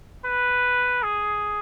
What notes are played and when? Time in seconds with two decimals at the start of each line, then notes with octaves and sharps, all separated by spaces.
0.25 B4
1.03 G#4